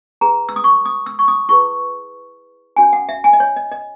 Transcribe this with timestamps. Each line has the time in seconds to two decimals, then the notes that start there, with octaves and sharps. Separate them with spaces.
0.21 E4 G#4 B4 A#5
0.49 E6
0.56 D#6
0.64 C#6
0.86 D#6
1.06 E6
1.19 C#6
1.28 D#6
1.49 E4 G#4 B4 C#6
2.76 C#4 F#4 C#5 G#5
2.93 F#5
3.09 E5
3.24 G#5
3.33 D#5
3.40 C#5
3.56 D#5
3.71 D#5